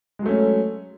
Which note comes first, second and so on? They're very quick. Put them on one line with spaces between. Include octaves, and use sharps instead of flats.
G#3 F#3 A3 C#4